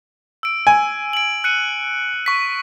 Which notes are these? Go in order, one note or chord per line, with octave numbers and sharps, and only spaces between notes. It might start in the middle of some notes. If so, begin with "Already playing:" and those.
E6 D7
G#5
D7 F#7
F#6 C#7 D#7
C#6 B6